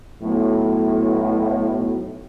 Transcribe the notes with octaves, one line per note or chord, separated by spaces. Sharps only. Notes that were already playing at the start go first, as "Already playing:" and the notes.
B1 A2